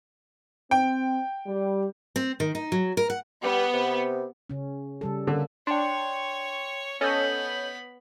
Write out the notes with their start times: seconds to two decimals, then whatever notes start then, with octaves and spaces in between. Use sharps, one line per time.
0.71 C4 G5
1.47 G3
2.16 C4
2.40 D#3
2.55 D#4
2.72 F#3
2.97 A#4
3.10 F#5
3.44 G3 B3
3.74 C3
4.50 C#3 C#4
5.01 C#3 G3 A4
5.27 D3 A#3 C#4
5.67 D4 C#5 G5 C6 C#6
7.01 B3 C#4 A4 C#5 D#5 B5 G6